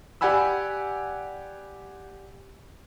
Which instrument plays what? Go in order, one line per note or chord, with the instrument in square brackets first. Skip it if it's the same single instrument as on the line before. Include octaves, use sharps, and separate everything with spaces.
[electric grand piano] G4 D5 F#5 G#5 B5 E6